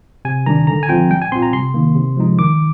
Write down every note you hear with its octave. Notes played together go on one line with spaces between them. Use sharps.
C3 G#5
D#3 G3 D4 A#5
D3 A#5
G#5
F3 C4 F4 G5
G3 G5
G#5
C4 F4 C6
A#5
C3 C6
D#3 A#3
C3
F3 G#3 D#4
D#3 D6